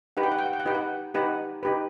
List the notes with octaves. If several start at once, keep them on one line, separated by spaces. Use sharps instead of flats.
D#4 G4 B4 F#5
G5
F#5
G5
F#5
G5
F#5
D#4 G4 B4 G5
F#5
D#4 G4 B4 F#5
D#4 G4 B4